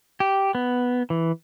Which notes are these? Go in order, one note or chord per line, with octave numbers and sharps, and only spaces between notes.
G4
B3
E3